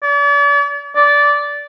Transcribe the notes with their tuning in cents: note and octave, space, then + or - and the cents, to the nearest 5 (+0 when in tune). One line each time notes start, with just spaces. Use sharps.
D5 -40
D5 -15